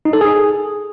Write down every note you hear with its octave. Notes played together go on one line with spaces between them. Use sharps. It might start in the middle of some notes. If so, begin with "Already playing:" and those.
D#4
A4
G#4